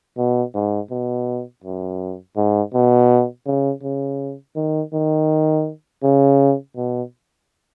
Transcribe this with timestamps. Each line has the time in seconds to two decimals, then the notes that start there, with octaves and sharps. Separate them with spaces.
0.18 B2
0.55 G#2
0.91 B2
1.64 F#2
2.37 G#2
2.74 B2
3.46 C#3
3.83 C#3
4.56 D#3
4.93 D#3
6.03 C#3
6.76 B2